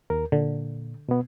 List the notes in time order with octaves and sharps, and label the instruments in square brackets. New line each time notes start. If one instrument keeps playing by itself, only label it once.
[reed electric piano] D#2 A#4
[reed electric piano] A#2 [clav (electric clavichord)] D3
[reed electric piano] B2 B3